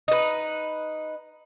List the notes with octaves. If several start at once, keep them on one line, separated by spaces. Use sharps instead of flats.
D#4 B4